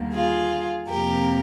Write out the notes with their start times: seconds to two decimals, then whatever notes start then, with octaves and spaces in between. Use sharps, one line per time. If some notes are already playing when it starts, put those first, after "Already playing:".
Already playing: D#2 D3 G3 A#3
0.14 F4 G#4
0.88 F2 C3 F3 A#3 G4 A#4